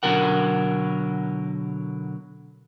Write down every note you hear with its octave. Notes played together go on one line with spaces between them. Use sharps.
B2 D3 F#3 A#4 F#5